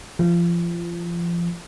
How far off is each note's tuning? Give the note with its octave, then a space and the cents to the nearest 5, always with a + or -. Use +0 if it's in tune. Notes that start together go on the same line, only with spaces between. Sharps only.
F3 -25